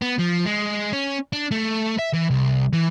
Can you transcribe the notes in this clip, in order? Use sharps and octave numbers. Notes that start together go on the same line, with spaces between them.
B3
F3
G#3
C#4
D4
A3
E5
E3
C2
E3